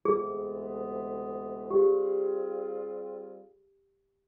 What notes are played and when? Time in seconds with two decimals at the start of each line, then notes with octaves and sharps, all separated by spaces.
0.04 D2 C3 E3 G#3 B3 G#4
1.71 G3 C4 F4 G4 G#4